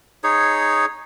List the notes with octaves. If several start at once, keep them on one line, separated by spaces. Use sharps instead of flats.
D#4 G#4 C#5